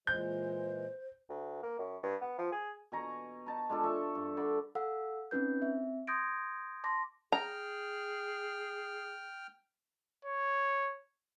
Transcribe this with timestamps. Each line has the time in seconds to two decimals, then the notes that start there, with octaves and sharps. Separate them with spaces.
0.07 A#2 E3 G#3 C5 G6
1.29 D2
1.63 A#3
1.79 F#2
2.03 G2
2.22 B3
2.38 F3
2.52 G#4
2.92 B2 G#5 A#5 C#6
3.46 D#4 A5 A#5
3.70 G#3 D4 F4 A4
3.84 A4 E5 C#6
4.15 G2
4.37 D3 D5 B5
4.75 A4 F5 F#5 E6
5.31 C4 C#4 D#4 B4 G6
5.62 C4 E5
6.07 C6 D#6 G6 G#6 A#6 D7
6.84 A5 C6 D6 A#6
7.32 G#4 G5 A#5 F6
10.25 C#5